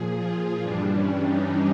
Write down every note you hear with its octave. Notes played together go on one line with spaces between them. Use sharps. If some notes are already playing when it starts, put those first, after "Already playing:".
Already playing: A#2 F3 G#4
F4
G2 E3 G3 D4
C#4
D#4